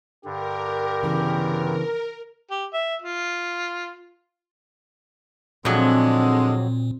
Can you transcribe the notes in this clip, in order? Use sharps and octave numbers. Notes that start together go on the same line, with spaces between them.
G2 D3 G4 A#4
C#3 E3 B3
G4
E5
F4
F2 A#2 D3 F#3 G#3 C4